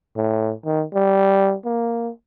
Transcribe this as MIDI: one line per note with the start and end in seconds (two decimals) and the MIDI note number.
0.16 0.53 45
0.65 0.84 51
0.94 1.55 55
1.65 2.10 58